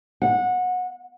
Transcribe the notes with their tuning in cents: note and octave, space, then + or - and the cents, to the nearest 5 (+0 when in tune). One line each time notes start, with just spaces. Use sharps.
F#5 -25